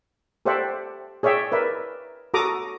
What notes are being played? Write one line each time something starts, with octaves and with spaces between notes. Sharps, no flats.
G4 A4 C5 D5 E5 F#5
G#4 C#5 D5 E5 G5
A#4 B4 D5 E5
F#4 A4 A#5 D6 D#6